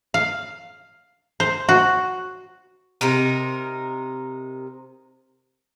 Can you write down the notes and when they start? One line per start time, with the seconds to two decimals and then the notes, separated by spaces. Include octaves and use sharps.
0.14 F5
1.40 C5
1.69 F#4
3.01 C3 D#4 A#4